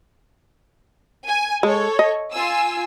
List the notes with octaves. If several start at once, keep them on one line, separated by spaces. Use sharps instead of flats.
G#5
G#3 A4 C#5
D#5
F4 G#5 E6